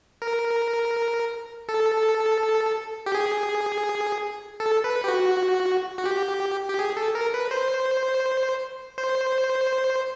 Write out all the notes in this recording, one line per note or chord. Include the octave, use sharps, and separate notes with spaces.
A#4
A4
G4
G#4
A4
B4
G4
F#4
F#4
G4
G4
G#4
A4
A#4
B4
C5
C5